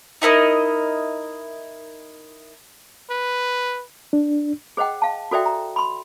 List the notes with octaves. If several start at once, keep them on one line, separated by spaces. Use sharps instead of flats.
D#4 E4 A#4 D#5
B4
D4
G#4 C5 D#5 F#5 G5
F5 A5
F#4 A4 C5 D5 E5 G5
A#5
B5 C6